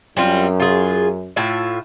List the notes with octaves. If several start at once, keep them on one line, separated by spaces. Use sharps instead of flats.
F#2 G3 C4 F4
F4 G#4
A2 F4 E5